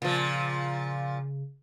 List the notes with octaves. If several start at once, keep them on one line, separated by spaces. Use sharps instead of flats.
A#2 C#3 F3